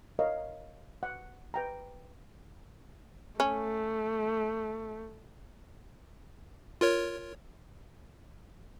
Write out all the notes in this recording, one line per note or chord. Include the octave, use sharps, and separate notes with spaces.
A#4 C#5 D#5 F5
F#5
B4 G5 A#5
A3 C#4
F4 A#4 C#5